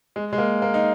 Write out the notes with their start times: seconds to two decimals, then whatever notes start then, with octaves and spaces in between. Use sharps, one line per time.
0.16 G#3
0.33 G#3
0.38 A#3
0.62 A#3
0.74 D#4